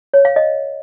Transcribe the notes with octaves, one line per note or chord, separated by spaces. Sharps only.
C#5
F5
D#5